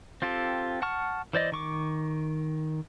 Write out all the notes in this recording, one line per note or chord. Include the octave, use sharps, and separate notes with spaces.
C4 F4 G4 A4
F#5 A5 C#6 F6
E3 C5 D5 D#5
D#3 C#6 D6